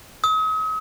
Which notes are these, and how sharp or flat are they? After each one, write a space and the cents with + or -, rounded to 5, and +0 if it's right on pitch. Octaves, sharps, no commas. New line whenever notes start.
D#6 +40